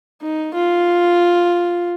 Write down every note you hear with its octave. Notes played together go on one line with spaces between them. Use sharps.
D#4
F4